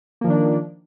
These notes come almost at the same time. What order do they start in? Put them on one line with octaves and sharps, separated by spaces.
A#3 F3 D#3 D4